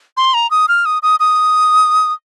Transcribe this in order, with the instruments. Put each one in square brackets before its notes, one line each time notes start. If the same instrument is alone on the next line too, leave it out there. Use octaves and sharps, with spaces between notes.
[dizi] C6
A#5
D#6
F6
D#6
D#6
D#6